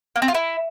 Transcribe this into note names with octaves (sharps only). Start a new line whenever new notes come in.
A#3
C4
F4
E4